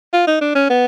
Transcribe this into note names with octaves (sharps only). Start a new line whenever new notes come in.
F4
D#4
D4
C#4
B3